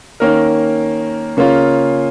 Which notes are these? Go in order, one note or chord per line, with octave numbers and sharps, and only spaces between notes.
D#3 A#3 C#4 A#4
C#3 A#3 C#4 F4